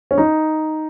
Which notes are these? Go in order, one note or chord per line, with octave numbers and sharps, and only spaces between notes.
C#4
D#4